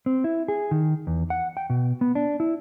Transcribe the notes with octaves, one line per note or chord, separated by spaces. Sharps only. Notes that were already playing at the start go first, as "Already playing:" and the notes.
C4
E4
G#4
D#3
E2
F#5
G5
B2
B3
D4
E4